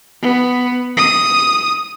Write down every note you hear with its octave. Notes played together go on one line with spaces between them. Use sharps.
B3
D#6